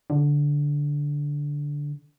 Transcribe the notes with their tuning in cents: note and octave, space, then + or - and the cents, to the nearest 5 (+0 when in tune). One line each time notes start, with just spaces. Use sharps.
D3 -10